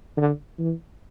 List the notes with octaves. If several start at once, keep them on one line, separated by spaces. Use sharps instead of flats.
D3
E3